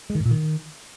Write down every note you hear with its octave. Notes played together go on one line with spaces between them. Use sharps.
G#3
D#3
G#2
A#2
D#3